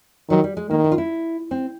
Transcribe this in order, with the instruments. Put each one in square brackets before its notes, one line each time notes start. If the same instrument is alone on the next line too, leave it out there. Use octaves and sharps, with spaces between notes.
[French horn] D#3 [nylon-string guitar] F#3
[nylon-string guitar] G3
G#3
[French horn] D#3 [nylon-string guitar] A#3
[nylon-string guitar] E4
F4
E4
C4